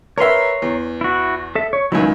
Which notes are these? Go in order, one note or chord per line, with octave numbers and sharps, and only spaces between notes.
A#4 B4 C#5 E5 A#5 C6
E2
E4 F#4
A4 E5
C#5
C#2 D#3 F#3 E4 G#5